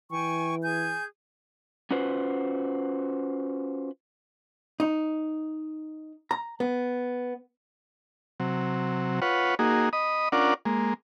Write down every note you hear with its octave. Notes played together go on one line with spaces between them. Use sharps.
E3 G5 G#5 C#6
G#4 G#5 G6
C#4 F4 F#4 B4 C5
D#4
A#5
B3
C3 F#3
F4 B4 C#5 F#5
A#3 D#4 F#4 G#4
D#5 B5 D#6
C#4 D4 F4 A#4 D5 F#5
G#3 A#3